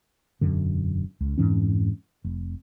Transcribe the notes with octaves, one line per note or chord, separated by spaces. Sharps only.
E1 F#2 D3
C#2
F2 G#2 E3 C#4
F1